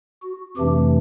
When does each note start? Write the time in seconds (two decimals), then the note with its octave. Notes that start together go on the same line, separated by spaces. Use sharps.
0.23 F#4
0.57 F2 C3 E3 A3 D4 G4